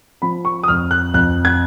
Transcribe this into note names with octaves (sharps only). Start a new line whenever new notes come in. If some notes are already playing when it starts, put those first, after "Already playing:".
F3 B5
C#6
D#6
F2 F6
F#6
F2 F#6
G#6